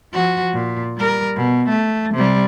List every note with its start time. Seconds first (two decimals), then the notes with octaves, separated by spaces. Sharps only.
0.13 F3 F#4
0.54 A#2
0.97 G3 A#4
1.36 B2
1.69 A3
2.14 C3 G3